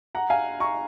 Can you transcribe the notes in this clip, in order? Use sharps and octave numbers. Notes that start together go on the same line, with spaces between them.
F#5 A#5
F5 G#5
A#5 C#6